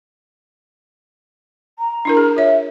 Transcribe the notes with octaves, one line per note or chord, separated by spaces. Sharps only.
A#5
D4 E4 A#4
G#4
F4 C#5 E5